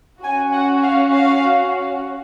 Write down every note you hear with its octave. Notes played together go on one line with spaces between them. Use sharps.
C#4 F#4 G#5
F#5
F5
F5